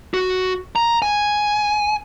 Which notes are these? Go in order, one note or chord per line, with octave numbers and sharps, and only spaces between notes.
F#4
A#5
G#5